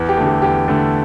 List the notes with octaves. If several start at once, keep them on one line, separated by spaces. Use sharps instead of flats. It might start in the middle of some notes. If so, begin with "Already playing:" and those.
Already playing: E2
G4
D3 A3
G4
E2 G4
D3 A3